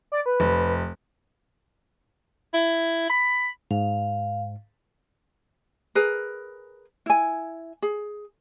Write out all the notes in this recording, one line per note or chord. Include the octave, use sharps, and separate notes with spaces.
D5
B4
F1
E4
B5
G#2 F5
G#4 A#4 B4
E4 G#5
G#4